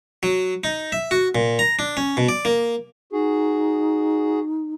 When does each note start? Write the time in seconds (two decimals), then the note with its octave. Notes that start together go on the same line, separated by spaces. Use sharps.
0.23 F#3
0.64 D#4
0.92 E5
1.11 F#4
1.35 A#2
1.59 A#5
1.79 D4
1.97 C#4
2.17 B2
2.29 D5
2.45 A#3
3.13 D#4 F#4 G#4